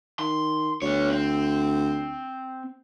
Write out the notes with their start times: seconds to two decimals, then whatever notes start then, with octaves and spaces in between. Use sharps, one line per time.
0.19 D#3 C6
0.82 D2 B3 C#5
1.11 C4